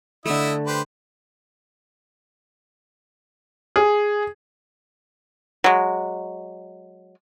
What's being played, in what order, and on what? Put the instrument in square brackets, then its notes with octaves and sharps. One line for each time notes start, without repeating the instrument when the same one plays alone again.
[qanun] D3 A3 [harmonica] E4 D#5 E5
[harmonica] G4 B4 C5
[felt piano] G#4
[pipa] F#3 G#3